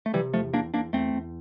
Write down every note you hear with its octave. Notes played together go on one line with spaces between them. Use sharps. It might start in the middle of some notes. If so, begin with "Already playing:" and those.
A3
C3 E3 G3
E2 F3 A3
E2 A#3 D4
E2 A#3 D4
E2 A3 C4
E2